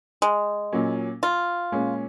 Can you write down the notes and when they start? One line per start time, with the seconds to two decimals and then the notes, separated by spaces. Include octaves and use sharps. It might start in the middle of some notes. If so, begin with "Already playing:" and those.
0.22 G#3
0.73 A#2 F#3 C#4
1.23 F4
1.72 A#2 G#3 C#4